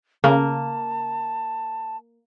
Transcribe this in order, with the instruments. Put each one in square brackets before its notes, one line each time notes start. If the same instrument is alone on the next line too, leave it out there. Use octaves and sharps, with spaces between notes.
[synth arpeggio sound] C#3 [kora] A#3 [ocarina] A5